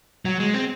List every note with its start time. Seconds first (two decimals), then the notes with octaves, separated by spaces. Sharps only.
0.25 F#3
0.39 G#3
0.54 C4